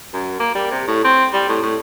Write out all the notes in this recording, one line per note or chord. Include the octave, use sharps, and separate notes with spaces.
F#2
A#3
G3
C3
A2
C4
G3
A2
A2